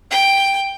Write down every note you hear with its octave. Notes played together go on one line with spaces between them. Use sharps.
G5